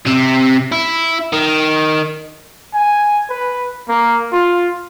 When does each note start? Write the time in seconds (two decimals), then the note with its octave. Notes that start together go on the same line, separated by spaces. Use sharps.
0.07 C3
0.72 E4
1.32 D#3
2.74 G#5
3.30 B4
3.89 A#3
4.32 F4